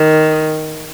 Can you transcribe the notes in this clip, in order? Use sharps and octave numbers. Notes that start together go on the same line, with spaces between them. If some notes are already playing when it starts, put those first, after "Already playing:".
Already playing: D#3